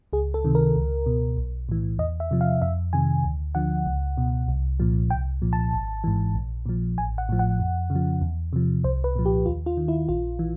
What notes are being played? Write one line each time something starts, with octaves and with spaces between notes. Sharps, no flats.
C#2 G#4
A4
C3 D#3
A#4
C#2
B2
B1
A2 E3
E2 D#5
E5
C3 F3
F5
F2 E5
C3 D#3 G#5
D2
D3 F3 F#5
C#2
B2
C2
A#2 F3
C2 G5
A#2 F3
A5
G#1
G#2 E3
A#1
A#2 F3
A1 G#5
F#5
A2 F3
F#5
F2
C#3
F3
E2
C3 F3
C2 C5
B4
A#2 F3
G4
D#2 F4
F4
D#3
E4
A#1 F4
E3